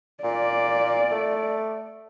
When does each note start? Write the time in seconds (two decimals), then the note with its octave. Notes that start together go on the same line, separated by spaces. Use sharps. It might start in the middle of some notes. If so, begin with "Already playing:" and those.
0.24 A#2 D5
1.11 A3